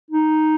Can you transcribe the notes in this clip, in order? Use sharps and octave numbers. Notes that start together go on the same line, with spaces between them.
D#4